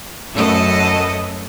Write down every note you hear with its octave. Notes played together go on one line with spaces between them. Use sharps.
F#2 F#3 A3 A4 B4 D#5